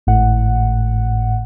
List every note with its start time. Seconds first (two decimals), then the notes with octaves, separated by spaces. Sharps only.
0.07 G#1 A2 F#5